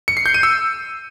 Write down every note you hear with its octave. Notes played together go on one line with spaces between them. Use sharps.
C#7
C7
G6
D#7
E6